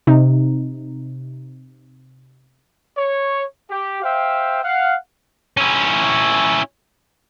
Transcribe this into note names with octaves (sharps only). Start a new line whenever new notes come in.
C3 D#4
C#5
G4
C5 E5 F5 G5
F5 F#5
C#4 E4